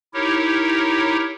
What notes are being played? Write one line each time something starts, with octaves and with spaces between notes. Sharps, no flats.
D#4 E4 G4 A#4 C#5